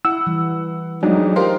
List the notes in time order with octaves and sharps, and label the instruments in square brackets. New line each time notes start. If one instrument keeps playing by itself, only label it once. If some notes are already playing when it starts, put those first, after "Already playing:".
[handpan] E4 [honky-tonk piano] F#5 [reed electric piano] E6
[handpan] E3 G3
[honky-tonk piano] F2 [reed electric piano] F#3 [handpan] G#3 A3 D#4 [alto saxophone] D4
[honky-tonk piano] F4 G4 A#4 [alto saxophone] C5